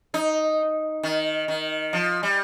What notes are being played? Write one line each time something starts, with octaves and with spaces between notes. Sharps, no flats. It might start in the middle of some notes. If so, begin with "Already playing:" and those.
D#4
D#3
D#3
F3
G3